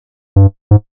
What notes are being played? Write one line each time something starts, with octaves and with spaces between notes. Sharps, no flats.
G2
G#2